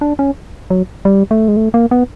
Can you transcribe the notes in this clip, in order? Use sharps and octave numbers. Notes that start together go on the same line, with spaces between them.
D4
C#4
F#3
G3
A3
G#3
A3
A#3
B3